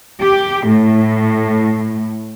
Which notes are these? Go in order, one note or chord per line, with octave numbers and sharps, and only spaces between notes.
G4
A2